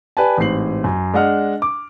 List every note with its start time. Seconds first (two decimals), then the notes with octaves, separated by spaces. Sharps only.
0.17 G4 B4 D5 G#5 A5
0.37 A1 G#2 C4 C7 F#7
0.84 F#2
1.14 G#3 D4 D#5 F#5 F6
1.62 D6